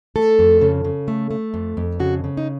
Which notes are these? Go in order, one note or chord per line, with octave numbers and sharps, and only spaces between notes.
A3 A4
F2
C#3
C#3
A3
A3
F2
F2
C#3 F#4
C#3
D#4